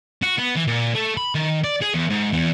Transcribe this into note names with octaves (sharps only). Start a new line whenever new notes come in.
F#4
B3
E3
A#2
A3
B5
D#3
D5
G#4
E2
G#2
E2